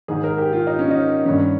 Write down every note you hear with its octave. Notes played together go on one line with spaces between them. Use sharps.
G#2 D#3 G#4
A#4
G4
F4
D#4
C#4
D#4
G2 D#3 C#4